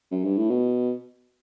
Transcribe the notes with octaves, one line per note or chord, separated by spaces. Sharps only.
F#2
G2
A2
B2